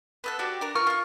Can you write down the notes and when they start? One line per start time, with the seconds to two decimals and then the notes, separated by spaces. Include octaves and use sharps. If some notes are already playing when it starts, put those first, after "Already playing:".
0.24 B3 A4 F#6
0.39 D4 F#4 G4 D5
0.61 D4 A#4
0.75 F4 A#4 C#6 F6
0.87 F4 C#6